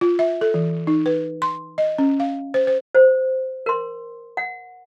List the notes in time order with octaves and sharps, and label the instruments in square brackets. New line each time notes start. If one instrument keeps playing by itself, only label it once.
[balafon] F4
E5
A4
E3
D#4
B4
C6
D#5
C#4
F5
C5
C5
[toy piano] C5
A#4 C6
F#5